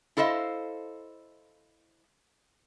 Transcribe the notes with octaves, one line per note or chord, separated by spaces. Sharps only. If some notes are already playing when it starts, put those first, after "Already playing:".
E4 A4 C5 D#5 F5